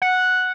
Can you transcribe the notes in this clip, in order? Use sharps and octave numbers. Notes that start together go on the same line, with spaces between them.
F#5